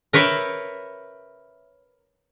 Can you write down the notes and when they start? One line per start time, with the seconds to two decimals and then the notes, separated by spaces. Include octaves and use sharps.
0.13 A#4 B4 C#5 E5 G5